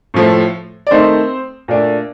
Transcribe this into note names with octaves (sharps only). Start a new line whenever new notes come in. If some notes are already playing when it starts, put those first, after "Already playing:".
A2 F3 A3
D5
D#3 A3 C4 D#4 C5
A#2 A3 D4